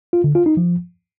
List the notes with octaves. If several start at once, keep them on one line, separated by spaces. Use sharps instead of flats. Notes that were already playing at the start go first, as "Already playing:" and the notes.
F4
D3
F4
D#4
F3